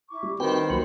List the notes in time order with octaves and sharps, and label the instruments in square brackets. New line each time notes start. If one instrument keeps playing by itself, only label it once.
[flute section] E4 C#6 D6
[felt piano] G3
[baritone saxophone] D#3 [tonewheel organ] C4 F#4 B4 [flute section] C5 B5 [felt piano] G5
[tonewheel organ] C2 F#3 [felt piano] A#3 F#4 A#4